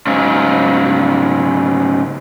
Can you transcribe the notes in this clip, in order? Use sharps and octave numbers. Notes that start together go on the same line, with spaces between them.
G#2 C#3 F#3